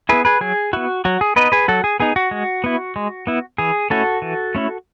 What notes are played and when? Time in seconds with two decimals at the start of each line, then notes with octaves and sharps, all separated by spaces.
0.09 B3 E4 G#4 B4
0.25 G#4 B4
0.41 F#3 G#4
0.73 B3 E4 F#4
1.05 F#3 F#4
1.21 G#4
1.36 B3 D#4 B4 D#5
1.52 G#4 B4
1.68 F#3 F#4 A4
1.84 G#4
2.00 B3 D#4 G#4
2.16 F#4
2.31 G#3
2.64 B3 E4
2.96 G#3
3.27 B3 E4
3.58 E3 G#4
3.90 A3 C#4 E4 F#4 A4
4.22 E3
4.55 A3 C#4 E4